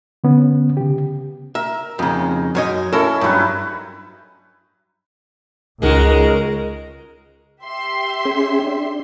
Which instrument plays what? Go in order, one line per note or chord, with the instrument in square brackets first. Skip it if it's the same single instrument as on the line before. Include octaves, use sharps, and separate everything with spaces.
[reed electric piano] D3 B3 C#4
C#3 G4
[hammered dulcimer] A#4 [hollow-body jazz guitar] E5
[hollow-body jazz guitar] F2 C#3 [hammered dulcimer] D#4
[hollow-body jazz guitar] F#2 C#5 D#5
[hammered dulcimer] C#4 E4 [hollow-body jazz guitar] A4 A#4
[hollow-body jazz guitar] G2 F#3 [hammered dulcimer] D#4 E4 B4
[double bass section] C#2 [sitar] G#3 D#4 F#4 [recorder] A#4
[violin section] G4 E5 C6
[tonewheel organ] C#4 G#4
D4